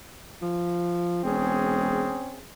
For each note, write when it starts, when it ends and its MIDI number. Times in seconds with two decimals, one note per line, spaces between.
0.42 1.22 53
1.24 2.18 28
1.24 2.42 60
1.24 2.42 61
1.24 2.42 68